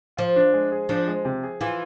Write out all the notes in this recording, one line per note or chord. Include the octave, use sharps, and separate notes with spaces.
F3 F4
D4
G#3
G#4
F3 D4
G#3
C3
G#4
E3 F4